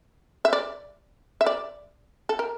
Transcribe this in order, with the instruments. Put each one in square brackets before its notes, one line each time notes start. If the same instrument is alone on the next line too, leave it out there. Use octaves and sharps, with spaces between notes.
[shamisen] E5
D5
E5
D5
A4
A#4